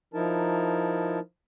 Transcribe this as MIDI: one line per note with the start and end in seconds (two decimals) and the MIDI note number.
0.14 1.19 53
0.14 1.19 63
0.14 1.19 64
0.14 1.19 70
0.14 1.19 81